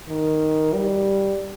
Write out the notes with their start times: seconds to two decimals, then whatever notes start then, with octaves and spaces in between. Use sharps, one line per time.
0.08 D#3
0.74 G3